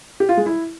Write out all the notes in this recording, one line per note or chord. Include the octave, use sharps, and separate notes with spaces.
G4
F4
G#3
E4